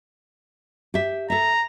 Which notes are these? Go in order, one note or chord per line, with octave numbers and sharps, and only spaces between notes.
G4 E5
A4 E5 A#5